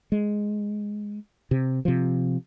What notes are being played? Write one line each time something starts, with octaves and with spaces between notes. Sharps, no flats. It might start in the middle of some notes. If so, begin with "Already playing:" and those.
G#3
C3
C3 F3